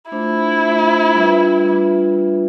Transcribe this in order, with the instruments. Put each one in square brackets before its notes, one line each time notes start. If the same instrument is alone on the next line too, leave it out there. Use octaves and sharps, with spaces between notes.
[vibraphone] A3 D4 F4 C5 [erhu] E4
[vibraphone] A3 D4 F4 C5
G3 D4 F4 B4 E5
G3 D4 F4 B4 E5